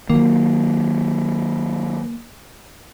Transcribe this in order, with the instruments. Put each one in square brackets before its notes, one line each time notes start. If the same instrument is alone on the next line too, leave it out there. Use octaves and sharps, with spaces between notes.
[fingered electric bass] D#3 F#3 [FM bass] A#3